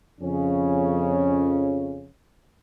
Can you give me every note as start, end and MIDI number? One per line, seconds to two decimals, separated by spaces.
0.21 2.07 41
0.21 2.07 49
0.21 2.07 61